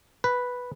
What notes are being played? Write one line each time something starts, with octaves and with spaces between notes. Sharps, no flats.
B4